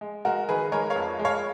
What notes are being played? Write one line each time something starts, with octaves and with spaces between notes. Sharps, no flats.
G#3
G#3 F#4 A#4
D#3 G#4 B4
G#3 A#4 C#5
C#5 F5
F2
G#3
C#5 F5